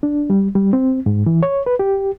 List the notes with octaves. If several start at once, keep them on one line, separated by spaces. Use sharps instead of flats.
D4
G3
G3
C4
G#2
E3
C#5
B4
G4